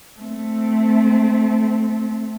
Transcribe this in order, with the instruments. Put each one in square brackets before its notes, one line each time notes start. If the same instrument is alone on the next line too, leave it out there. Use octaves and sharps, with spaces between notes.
[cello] A3 C4